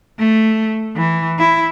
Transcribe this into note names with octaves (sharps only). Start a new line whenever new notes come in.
A3
E3
E4